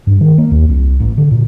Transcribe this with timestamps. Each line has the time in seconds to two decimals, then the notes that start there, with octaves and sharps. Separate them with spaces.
0.07 G2
0.21 D#3
0.38 A#3
0.51 D#2
0.69 C2
1.00 A1
1.18 D3
1.31 A#2